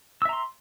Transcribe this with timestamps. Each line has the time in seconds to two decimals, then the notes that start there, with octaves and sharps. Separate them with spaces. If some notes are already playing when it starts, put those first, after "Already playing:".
0.22 E6
0.25 E5
0.29 A#5
0.33 C6